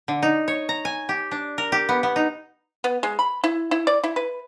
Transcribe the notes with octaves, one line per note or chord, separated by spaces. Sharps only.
D3
D#4
C#5
A#5
G#5
G4
D4
A#4
G4
B3
B3
D#4
B3
G#3
B5
E4
E4
D5
E4
B4